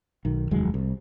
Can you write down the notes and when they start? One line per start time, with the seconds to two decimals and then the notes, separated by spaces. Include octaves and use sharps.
0.25 B1 D#3
0.51 F1 D#2 F#3 G#3
0.74 C2